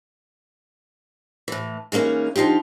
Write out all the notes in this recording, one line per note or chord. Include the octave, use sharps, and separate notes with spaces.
A2 E3
E3 G#3 A#3 C#4 D#4
D3 F3 D#4 F4 G4